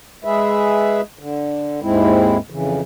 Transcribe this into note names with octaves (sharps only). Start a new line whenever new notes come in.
G#3 G#4 B4 E5
D3
D#2 G#2 G#3 C4 E4
F2 C#3 E3